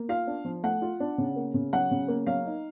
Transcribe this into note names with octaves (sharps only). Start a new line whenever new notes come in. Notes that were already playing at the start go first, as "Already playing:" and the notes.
Already playing: A#3
F4 F5
D4
F3
A3 F#5
F4
D4
C#3
A#3
C#3
F#3 F#5
C#3
A#3
F#3 F5
D#4